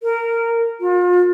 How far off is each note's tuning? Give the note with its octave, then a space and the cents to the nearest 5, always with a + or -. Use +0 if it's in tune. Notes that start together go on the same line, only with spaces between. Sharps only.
A#4 -15
F4 +40